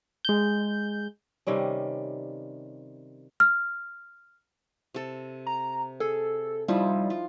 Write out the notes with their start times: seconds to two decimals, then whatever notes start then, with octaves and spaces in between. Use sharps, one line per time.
0.25 G#3 G6
1.47 C3 D#3 G3 C#4
3.40 F6
4.95 C3 A4
5.47 A#5
6.00 G#4 A4
6.68 F3 G3 D#4 E4
7.10 F4